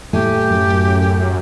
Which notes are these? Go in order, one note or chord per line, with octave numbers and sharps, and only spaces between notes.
A2 A3 G4 G#5
F#2